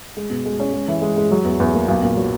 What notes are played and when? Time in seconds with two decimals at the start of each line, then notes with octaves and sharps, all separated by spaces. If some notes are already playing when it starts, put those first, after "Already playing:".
0.17 G#3
0.30 B2
0.45 G#3
0.60 C#4
0.73 G#3
0.88 E3
1.02 G#3
1.17 G#3
1.31 F#3
1.45 E2
1.60 E2
1.74 A#3
1.88 B1
2.03 A#2
2.17 F#3